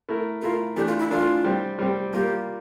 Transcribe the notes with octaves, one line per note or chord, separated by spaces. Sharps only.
A3 E4 A#4
A3 E4 F4 A#4
E3 A3 D4 G4
F4
E4
E3 A3 D4 F4
G3 C4 G4
G3 C4 G4
G3 A#3 F4 G4 A#4